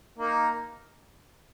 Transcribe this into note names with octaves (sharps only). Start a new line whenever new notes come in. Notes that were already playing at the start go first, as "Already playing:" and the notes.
A#3 D#4